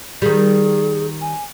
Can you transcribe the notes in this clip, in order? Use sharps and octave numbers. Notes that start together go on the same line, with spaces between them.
D#3 G3 G#4
G#5